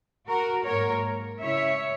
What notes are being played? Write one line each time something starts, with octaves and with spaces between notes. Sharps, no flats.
F#4 A#4
G#2 F#3 A#3 A#4 C#5
C#3 G#3 C#4 E4 C#5 E5